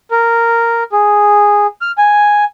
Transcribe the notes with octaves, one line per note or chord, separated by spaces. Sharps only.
A#4
G#4
F6
G#5